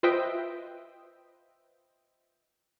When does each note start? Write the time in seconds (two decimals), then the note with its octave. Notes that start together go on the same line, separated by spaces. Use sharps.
0.03 F4 B4 C5 D#5 E5 G5